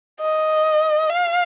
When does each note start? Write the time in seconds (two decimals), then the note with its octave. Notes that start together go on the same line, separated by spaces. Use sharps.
0.20 D#5
1.10 F5